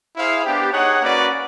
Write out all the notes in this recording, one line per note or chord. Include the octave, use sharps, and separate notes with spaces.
E4 G#4 C5 F5
B3 D4 G4
D#4 G#4 C#5 F#5
A#3 C#4 F#4 B4 D5